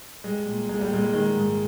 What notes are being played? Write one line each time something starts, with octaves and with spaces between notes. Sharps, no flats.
G3 G#3
A#2
C2 G#3
G3
A#2 G#3
D#3 G#3
G#2